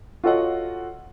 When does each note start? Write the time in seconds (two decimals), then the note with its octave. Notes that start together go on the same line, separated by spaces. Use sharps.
0.24 F4 F#4 A4 C#5 D#5 F#5